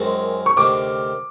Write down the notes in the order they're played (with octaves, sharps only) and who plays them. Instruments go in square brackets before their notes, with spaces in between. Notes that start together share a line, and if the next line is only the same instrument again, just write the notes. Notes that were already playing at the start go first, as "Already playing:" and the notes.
Already playing: [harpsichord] F#2 D#3 G#3 C4
[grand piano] C#6
[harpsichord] D2 C3 D#3 [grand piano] D6